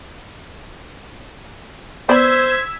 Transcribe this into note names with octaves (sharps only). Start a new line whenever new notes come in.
B3 C5 D5 B5 E6 G#6 B6